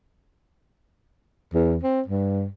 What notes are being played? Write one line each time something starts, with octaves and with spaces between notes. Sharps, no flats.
E2
C4
G2